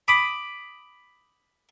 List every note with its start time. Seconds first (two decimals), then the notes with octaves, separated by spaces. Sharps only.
0.08 B5 D6 D#6